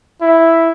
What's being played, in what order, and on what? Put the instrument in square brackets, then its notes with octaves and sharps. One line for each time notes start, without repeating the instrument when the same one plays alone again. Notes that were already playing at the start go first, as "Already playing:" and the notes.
[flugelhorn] E4